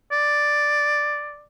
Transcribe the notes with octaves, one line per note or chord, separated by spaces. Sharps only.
D5